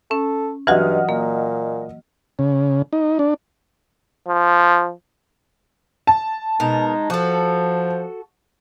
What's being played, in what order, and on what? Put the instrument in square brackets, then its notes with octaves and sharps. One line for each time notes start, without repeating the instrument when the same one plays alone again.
[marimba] C#4 [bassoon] A4
[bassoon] G2 [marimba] E3 F#3 F#4 [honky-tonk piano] D#5 F#5 F6
[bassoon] A#2 [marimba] A#3
[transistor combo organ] C#3
D#4
D4
[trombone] F3
[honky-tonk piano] A5
[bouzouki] B2 A#4 [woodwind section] G#3 D#4
[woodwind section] F3 [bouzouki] F#4 A4